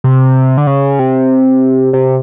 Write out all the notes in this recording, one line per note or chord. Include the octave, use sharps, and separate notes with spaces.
C3
D3
C#3
C3
C3